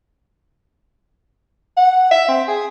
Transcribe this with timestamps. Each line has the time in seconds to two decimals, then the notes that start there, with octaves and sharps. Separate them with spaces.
1.77 F#5
2.11 E5
2.28 C4
2.48 G#4